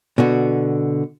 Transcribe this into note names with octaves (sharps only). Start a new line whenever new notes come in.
B2 D3 F#4